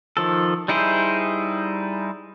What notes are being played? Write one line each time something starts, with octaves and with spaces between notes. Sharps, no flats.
D#3 F3 A4
G3 D#4 E4 G#4 C5